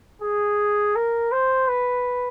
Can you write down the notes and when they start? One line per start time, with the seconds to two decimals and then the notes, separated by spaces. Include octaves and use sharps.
0.22 G#4
0.96 A#4
1.32 C5
1.68 B4